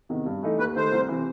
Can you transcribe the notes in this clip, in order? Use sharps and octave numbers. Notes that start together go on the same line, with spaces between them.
E2 C3 D#3
G2
E3 A3 D#4
D#2 B4
D#3 A3 C5
C2
C3 E3